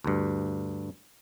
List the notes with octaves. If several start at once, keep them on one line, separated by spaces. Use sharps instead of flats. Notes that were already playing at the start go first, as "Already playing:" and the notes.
D2 G2